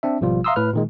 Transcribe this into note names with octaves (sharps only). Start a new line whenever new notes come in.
C4 D4 E5
G#1 B2 F3 G3 F4
E5 F5 A#5 C6 D#6 E6
A2 B4 F6
A#2 D#3 G#3